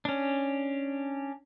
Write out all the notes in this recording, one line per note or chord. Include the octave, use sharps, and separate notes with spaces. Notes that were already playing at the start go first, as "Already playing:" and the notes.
C#4 D4